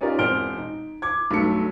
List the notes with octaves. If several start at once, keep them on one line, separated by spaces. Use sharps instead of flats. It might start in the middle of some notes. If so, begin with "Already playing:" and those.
C#4 D#4 F4 G4 A#4 D5
E1 C4 C5 F6 D7 G7
D#4
D6 G#6
B1 G2 F#3 A3 C#7